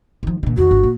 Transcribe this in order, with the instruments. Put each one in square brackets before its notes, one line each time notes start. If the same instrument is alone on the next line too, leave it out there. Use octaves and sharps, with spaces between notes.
[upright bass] D#3 F3
A#2 D3
[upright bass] F2 D#3 [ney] F#4
[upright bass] G1
A#2